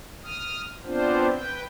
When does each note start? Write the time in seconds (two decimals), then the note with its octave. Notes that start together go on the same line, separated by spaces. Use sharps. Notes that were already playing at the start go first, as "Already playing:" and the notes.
0.23 D#6 F6
0.85 B3 C4 D4 F4 C5
1.33 B4 G5